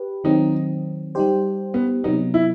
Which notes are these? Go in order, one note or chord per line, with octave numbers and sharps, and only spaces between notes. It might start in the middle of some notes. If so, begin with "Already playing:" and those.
Already playing: G4 B4
D#3 F#3 C4 D#4
G3 D#4 G4 C5
B3
C3 F#3 B3 D#4
E4